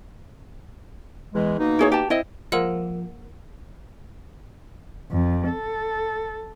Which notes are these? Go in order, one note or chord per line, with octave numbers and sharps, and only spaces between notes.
E2 E3 G#3
B2 A#3 D#4
E4 G#4 C#5
G4 A5
C4 E4 D#5
F3 G#3 A#3 F#5 E6 F#7
F2
A4